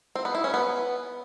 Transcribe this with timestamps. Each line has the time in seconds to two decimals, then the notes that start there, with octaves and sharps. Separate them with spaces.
0.16 C4
0.25 B3
0.35 E4
0.44 C#4
0.54 B3